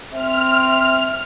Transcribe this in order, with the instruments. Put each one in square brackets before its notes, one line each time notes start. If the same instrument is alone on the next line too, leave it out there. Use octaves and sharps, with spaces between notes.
[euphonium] C4 [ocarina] E5 [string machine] F6